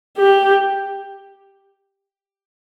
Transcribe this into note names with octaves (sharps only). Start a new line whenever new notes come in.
G4